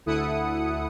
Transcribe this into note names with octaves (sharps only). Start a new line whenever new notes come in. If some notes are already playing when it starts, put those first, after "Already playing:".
D2 E4 A4 F#5 D#6 C#7